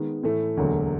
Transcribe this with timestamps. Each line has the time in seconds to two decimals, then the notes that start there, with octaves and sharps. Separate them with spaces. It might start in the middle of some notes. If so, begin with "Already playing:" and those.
Already playing: D#3 G#3 B3
0.23 A2 E3 A3
0.57 E1 D2 D3 F#3 A#3